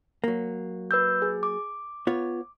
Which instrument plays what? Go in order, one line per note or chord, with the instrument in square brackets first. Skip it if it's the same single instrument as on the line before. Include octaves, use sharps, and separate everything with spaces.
[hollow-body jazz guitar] F#3 A#3
[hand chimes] B4 E6 G6
G#4
D6
[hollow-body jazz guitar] B3 F4 C#5